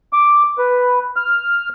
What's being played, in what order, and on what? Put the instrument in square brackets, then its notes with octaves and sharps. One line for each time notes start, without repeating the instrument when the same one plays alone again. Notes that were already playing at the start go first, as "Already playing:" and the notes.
[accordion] D6
B4
F6